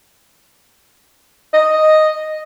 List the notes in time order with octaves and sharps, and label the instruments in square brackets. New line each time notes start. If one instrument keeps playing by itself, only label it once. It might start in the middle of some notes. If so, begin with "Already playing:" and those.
[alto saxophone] D#5